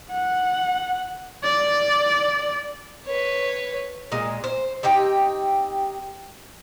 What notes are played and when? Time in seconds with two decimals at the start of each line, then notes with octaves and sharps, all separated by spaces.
0.12 F#5
1.44 D5
3.06 B4 C#5
4.12 A#2 G#3
4.44 C5
4.83 C4 D#4 G4 G5